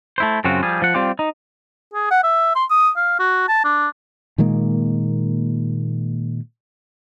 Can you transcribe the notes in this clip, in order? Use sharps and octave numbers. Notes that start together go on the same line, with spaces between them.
A3 E4 C5
F#2 C#3 C4 F4 F#4
F3 G3 G#4
F3 F#5
G3 C4 F4 G4
D#4
G#4
F#5
E5
C6
D#6
F5
F#4
A5
D4
A#2 D#3 G#3 A#3